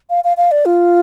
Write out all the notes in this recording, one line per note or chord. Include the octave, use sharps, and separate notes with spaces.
F5
F5
F5
D5
F4